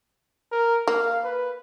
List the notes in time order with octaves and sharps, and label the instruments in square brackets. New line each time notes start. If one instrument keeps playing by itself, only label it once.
[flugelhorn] A#4
[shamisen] A#3 [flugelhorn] F5
[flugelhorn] B4